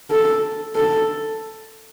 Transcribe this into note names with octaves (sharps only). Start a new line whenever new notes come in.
A4
A4